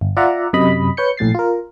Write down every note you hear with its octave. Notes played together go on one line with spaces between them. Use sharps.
G1
F4 D5 E5 F#5 A#5
F#2 C3 D#5 B5
B4 C#5 G6 C#7
A#1 A2 A6 C7
F4 A#4